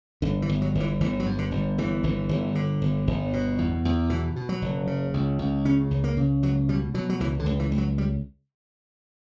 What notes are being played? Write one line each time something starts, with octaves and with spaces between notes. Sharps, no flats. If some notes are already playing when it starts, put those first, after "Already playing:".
G1 D3
E3
G1
F#3
G1
E3
G1 E3
F#3
G2
D3
G1
G1 E3
G1
G1
D3
G1
G1
B2
E2
E2
B2 E3
B2
F#3
F#1
C#3
C#2
C#2
C#3 C#4
C#2
A#3
C#3
C#2 F#3
B2 G3
B2 F#3
F#3
C#2 E3
D3
C#2
E3
C#2
F#3
G3